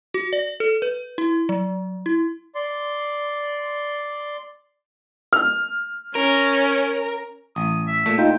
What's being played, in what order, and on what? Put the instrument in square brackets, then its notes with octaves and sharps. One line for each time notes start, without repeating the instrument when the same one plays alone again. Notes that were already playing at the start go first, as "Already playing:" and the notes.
[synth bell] F#4
D5
A4
B4
E4
F#3
E4
[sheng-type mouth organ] D5 C6
[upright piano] F6
[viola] C#4 [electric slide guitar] A#4
[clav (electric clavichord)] A1 [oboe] D#6
[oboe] E5
[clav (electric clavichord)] A#2 A3
[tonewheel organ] D#4 F4 [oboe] G5